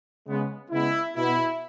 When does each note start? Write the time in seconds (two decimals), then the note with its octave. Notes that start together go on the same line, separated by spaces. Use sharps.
0.27 C#3 G#3 B3
0.71 C#3 G#3 B3 E4
1.16 B2 B3 E4